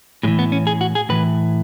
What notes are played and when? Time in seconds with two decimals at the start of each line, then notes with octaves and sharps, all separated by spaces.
0.23 A2 G#3
0.27 E3
0.39 B3
0.52 C#4
0.67 G#4
0.81 F#4
0.95 G#4
1.09 A2 E3 B4